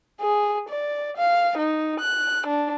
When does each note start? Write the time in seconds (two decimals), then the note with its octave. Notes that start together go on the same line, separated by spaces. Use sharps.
0.21 G#4
0.69 D5
1.17 F5
1.58 D#4
2.00 F#6
2.47 D4